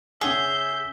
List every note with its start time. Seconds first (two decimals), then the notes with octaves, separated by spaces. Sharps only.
0.21 C#3 C#4 G#4 E5 F#5 G6